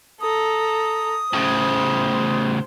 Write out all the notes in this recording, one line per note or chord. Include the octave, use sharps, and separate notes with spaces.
A4 A#5 D#6
A2 C#3 C5